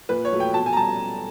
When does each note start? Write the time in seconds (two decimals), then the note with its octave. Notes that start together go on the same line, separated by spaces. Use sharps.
0.09 A#2 B4
0.25 C#5
0.32 F#3 A3
0.40 G5
0.54 B2 A5
0.66 G#5
0.73 A#5
0.77 G3 A5